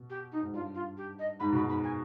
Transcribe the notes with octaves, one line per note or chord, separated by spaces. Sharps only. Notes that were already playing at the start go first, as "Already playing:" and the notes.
Already playing: B2
G4
D#4
G#2
G2 F4
F4
G4
D#5
G#2 B5
B2 B5
G#2
B5
G#5